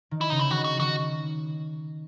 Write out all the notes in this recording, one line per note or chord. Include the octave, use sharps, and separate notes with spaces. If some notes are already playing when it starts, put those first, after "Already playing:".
D#3
E4
C#3 D#4
E4
D#3 F#4
F#4
D#3 F#4